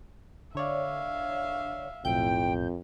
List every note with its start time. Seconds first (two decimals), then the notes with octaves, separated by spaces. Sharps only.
0.55 D3 C#5 D5 E5 F5
2.05 B1 F2 A2 G5 G6